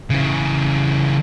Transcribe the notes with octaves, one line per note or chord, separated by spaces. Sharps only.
C#3 E3